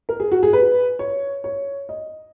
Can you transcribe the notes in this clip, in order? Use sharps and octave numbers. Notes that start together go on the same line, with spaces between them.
A#4
G#4
F#4
G#4
B4
C#5
C#5
D#5